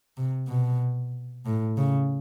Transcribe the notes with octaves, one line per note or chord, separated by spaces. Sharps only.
C3
B2
A2
C#3